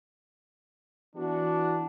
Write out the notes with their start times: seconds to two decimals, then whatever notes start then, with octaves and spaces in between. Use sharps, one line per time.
1.16 E3 B3 D4 F#4